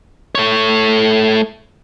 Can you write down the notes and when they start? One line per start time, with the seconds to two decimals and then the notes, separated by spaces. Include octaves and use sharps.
0.35 A3 C#5